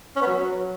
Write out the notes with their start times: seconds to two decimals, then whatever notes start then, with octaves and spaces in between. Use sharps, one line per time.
0.16 C#4
0.21 B3
0.27 F#3